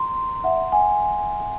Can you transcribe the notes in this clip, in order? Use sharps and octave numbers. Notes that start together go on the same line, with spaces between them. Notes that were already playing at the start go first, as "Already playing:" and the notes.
Already playing: A#5 C6
E5 F#5
F#5 G#5